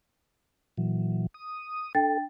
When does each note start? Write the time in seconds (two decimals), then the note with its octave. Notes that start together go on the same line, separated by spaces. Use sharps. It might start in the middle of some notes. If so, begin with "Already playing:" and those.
0.78 A#2 E3 F#3
1.34 D#6
1.95 D4 A4 G5 A6